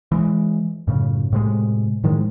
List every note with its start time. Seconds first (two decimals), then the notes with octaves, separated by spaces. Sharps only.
0.12 E3 G#3
0.87 F#2 A2 C#3
1.32 A2 C3 G#3
2.04 A2 D#3 F3 G#3